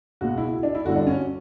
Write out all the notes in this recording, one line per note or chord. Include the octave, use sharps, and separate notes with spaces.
C#2 B2 F#4
E4
D4
E4
G1 G2 D3 F#4
D4
C#4